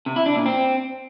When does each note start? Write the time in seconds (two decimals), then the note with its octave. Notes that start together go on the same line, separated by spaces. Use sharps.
0.06 C3
0.16 E4
0.26 D4
0.36 A#2
0.46 C4